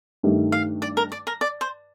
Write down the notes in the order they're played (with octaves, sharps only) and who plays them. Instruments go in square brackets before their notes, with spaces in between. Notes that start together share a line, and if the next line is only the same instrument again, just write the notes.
[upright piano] G2 D#3 A3 D#4 G4
[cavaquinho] F5
D5
A#4
D5
A#4
D5
C5